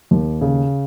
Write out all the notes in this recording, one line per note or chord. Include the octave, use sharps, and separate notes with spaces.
D#2
C#3